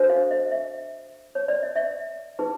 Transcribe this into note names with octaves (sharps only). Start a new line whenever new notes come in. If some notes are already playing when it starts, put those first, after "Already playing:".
Already playing: D4 F#4 A4 C5
F5
D#5
E5
C#5
D5
D#5
E5
D#4 G#4 B4